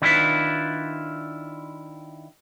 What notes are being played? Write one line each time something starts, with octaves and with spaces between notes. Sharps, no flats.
D#3 D4 E4 F4 G4 B4